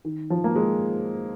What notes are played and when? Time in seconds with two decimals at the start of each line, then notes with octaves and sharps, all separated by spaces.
0.05 D#3
0.30 F3
0.44 A#3
0.55 G#3